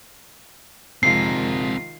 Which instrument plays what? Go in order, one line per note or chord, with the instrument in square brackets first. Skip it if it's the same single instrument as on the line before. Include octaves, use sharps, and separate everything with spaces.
[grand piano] C3 F3 G#3 [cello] D#3 F4 [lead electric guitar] C4 A#4 [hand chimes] C7